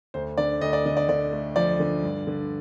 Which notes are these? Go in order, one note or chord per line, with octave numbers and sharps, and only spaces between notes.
D2 C5
D3 D5
D2 D#5
D5
D3 D#5
D5
D3 D5
A3
F3 D5
D3
G2
D3